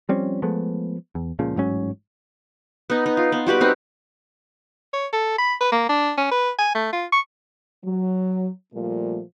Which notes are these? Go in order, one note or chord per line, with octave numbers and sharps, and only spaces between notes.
F3 G3 C4 C#4
F3 G#3 A3 B3
E2
C#2 A#2 C#3 F3
A1 G#2 F#3 C#4
B3 D#4
D#4
F4
B3
G3 F#4 G4 B4
C4 D#4 B4
C#5
A4
B5
B4
A#3
D4
C#4
B4
G#5
A3
F4
C#6
F#3
A#2 F3 G3 A3 F4